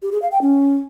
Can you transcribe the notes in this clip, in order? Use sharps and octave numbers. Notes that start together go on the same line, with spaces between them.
G4
G#4
F5
G5
C#4